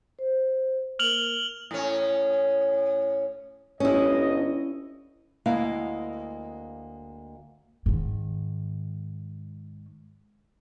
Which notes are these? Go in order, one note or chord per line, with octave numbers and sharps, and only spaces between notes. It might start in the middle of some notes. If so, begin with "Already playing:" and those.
C5
A#3 A#4 F6 F7 F#7
A2 C#4
G1 C#4 E4 D#5
D2 G#3 A#3 E4 F5
G#2 D#3